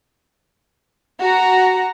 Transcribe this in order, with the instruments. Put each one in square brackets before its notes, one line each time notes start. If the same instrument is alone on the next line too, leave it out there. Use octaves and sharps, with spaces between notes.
[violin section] F#4 F#5 A#5